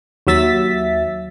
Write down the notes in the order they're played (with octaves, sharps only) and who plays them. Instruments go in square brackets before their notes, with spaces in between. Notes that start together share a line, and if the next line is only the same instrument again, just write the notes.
[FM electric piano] D#2 F#3 E5 A6 B6